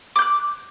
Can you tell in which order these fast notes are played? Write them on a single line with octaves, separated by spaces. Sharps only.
D6 G6 F#6